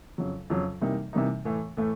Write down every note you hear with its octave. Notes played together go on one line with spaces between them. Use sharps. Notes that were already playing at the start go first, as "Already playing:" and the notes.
F2 C#3 F#3
F2 C#3 F#3
C3 E3 G3 A#3 D#4
C3 E3 G3 A#3 D#4
A2 E3 A3
A2 E3 A3